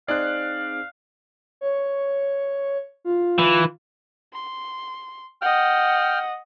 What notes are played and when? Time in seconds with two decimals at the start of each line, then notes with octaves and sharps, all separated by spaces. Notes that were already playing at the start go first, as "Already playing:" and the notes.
0.08 C4 D#4 G#4 D5 F5 F#6
1.61 C#5
3.05 F4
3.38 E3
4.33 C6
5.42 D#5 F#5 G5 F6